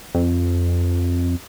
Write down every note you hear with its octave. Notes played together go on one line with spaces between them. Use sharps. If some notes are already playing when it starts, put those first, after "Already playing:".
F2